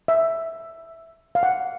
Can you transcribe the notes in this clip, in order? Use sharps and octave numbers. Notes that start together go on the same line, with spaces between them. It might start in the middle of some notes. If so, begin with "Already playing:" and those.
E5
F5
F#5